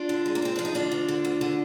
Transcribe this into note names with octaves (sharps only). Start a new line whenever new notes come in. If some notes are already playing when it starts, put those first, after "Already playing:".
Already playing: D4 F4
D3
G#3
A#3
G#3 C4
F3 D4
D#4
D2 D4 F4
D2
D3
D2
D3